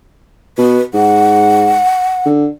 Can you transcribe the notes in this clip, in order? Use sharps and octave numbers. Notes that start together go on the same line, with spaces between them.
B2 B4
G#2 F#5
D3